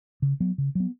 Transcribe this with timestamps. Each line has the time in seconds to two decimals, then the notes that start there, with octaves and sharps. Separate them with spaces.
0.22 C#3
0.40 F#3 B3
0.58 C#3
0.75 F#3 B3